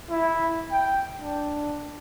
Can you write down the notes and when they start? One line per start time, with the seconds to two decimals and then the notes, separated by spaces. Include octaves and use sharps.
0.10 E4
0.72 G5
1.20 D4